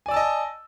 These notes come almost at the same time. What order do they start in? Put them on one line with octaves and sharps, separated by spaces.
G#5 D5 E6 A5 D#5